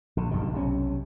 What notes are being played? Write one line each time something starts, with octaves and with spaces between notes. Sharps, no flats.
A#1 D3
F#1 G2 B2 D#3
B1 C3 C#4